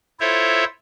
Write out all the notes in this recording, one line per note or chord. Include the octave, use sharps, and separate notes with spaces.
E4 F4 A4 C5 C#5 E5